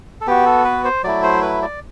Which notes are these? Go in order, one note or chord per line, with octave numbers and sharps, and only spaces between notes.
A4
B3 F#4 G4
A4
B4
C5
F#3 A3 E4 D5
C5
B4
D5